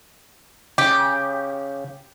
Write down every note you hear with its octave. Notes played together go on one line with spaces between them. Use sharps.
C#3 G4